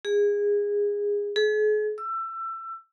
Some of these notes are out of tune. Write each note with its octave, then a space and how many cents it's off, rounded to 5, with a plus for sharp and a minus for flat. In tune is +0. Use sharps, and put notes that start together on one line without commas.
G#4 -20
G#4 +40
E6 +25